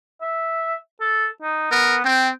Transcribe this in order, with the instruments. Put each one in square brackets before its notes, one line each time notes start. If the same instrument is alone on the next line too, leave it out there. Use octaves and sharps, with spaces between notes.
[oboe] E5
A4
D#4
[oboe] B3 [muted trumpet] A#4
[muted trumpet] C4 [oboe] G5